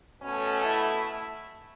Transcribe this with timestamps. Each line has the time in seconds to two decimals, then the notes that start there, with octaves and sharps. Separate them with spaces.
0.21 B2 A3 C#4
0.63 E4